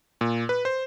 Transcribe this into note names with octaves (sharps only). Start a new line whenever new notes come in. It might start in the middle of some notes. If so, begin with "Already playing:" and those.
A#2
B4
C5